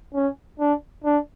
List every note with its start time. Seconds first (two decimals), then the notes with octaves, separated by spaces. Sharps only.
0.15 C#4
0.60 D4
1.05 D4